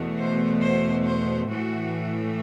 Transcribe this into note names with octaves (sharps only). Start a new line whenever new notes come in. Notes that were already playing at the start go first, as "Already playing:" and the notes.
Already playing: E2 B2 A3
C5
C5
C5
A2 E3 A3 F#4